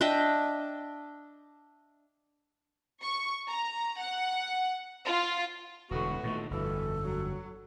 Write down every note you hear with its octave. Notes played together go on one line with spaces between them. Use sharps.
D4 D#5 E5 G5
C#6
A#5
F#5
F4
E1 A2 D3 B3 F#4
A#2 D3 D#3 A3
G1 F2 B2 E3 A4
F#3